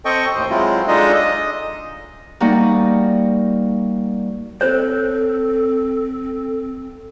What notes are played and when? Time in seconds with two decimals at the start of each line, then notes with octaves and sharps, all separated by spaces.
0.05 C4 A4 D#5 G5 C#6
0.35 D#2 A2 C5
0.50 F#3 G#3 C4 E4 F4
0.88 G#3 D4 D#4 F4 A4 D#5
1.14 D#5
2.40 G3 A#3 D#4 F#4
4.61 C4 A4 C5 C#5